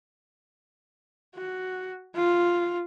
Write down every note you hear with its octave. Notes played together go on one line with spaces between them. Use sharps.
F#4
F4